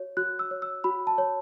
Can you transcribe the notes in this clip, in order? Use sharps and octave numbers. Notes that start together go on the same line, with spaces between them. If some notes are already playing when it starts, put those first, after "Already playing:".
Already playing: F#4 C#5
F#4 F#6
E6
C#5
E6
F#4 B5
A5
C#5